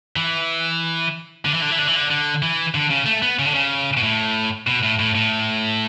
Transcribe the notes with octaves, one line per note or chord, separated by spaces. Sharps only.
E3
D3
E3
D3
E3
D3
E3
D3
D3
E3
D3
C#3
A3
B3
C#3
D3
C#3
B2
A2
B2
A2
A2
A2